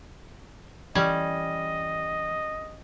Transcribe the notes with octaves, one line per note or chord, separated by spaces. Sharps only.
E3 G3 C#4 D#5